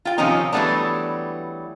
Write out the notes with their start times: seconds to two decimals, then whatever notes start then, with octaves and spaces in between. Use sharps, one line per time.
0.05 F4 G5
0.18 C3 D#3 F3 C4 C#4 D#4
0.52 E3 F#3 G3 A3 B3 D4